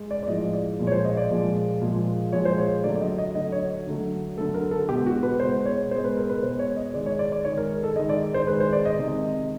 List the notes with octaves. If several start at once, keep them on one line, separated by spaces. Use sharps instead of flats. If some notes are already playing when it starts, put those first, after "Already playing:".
Already playing: G#3
D5
D5
A2 F3 G#3 D#5
D5
A#2 F3 G#3
C#5
C5
D#5
D5
A#2 F3 G#3
A#2 F3 G#3
A#2 F3 G#3 C#5
C5
C#5
D3 F#3 A3 D5
D5
D#5
D#5
D3 F#3 A3 D#5
C#5
D3 F#3 A3
D3 F#3 A3 A4
A#4
A4
B2 G#3 G4
F#4
B4
B2 G#3 C5
C#5
B2 G#3 C5
B4
A#4
B4
B2 G#3 C5
C#5
D#5
D#3 G#3 D5
C#5
D5
D5
D#3 G#3 C#5
A#4
A4
D#3 G#3 D#5
D5
C5
D#3 G#3 B4
C5
D5
D#5
C3 D#3 G#3
D#5